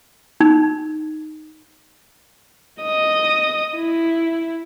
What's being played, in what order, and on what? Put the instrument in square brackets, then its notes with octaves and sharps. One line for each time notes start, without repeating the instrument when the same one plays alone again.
[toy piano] D#4
[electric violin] D#5 D#6
E4